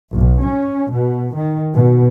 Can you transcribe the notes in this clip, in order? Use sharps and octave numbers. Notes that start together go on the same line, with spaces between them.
B1
C#4
B2
D#3
B2